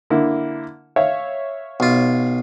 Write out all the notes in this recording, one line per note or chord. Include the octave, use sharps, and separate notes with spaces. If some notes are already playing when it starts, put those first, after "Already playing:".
D3 A#3 E4
C#5 E5 F5
B1 F4